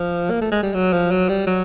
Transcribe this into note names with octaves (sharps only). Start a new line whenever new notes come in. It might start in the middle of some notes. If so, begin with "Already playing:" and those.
Already playing: F3
A#3
A3
G#3
G3
F#3
F3
F#3
G3
F#3